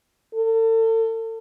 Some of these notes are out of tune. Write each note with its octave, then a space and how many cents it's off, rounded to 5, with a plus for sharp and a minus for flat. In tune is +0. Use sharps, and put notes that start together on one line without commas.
A4 +35